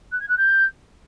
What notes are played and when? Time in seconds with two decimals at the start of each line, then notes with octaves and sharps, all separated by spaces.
0.11 F#6
0.20 G#6
0.28 F#6
0.37 G6